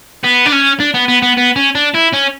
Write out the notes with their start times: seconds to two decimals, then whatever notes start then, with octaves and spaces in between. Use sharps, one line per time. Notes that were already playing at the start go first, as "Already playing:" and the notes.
0.23 B3
0.45 D4
0.52 C#4
0.80 D4
0.94 B3
1.08 B3
1.23 B3
1.37 B3
1.56 C#4
1.75 D4
1.94 E4
2.13 C#4